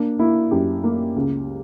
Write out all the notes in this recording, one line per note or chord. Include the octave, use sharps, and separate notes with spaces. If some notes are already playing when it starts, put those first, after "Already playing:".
Already playing: A#3 D4
A#3 E4
F#2 G4
A#3
C#2